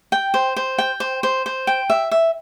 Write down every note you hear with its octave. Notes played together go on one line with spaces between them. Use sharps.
G5
C5
C5
G5
C5
C5
C5
G5
E5
E5